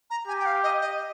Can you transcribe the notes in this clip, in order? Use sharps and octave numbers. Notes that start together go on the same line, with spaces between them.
A#5
G4 G#5
G5
F5
D#5
D#5